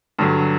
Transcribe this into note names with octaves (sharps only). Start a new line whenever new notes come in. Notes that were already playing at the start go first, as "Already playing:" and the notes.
G2 D3 F#3